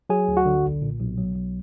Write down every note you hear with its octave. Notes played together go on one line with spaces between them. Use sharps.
F#3 G#4 G#5
D2
F#4 F#5
D3
B1
A#2
B1
F#3
B1